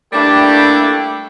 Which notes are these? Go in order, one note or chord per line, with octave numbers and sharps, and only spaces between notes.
G3 A3 A#3 D4 E4 G4